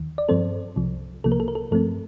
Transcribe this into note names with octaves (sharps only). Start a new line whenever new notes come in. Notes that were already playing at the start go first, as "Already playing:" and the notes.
Already playing: D#2 D#3
D5
G2 F3 C4 A4 C5
C2 C3 F3
C2 C3 F3 A#3 A4
A#4
A4
A#4
A4
G2 F3 A3 C4 A4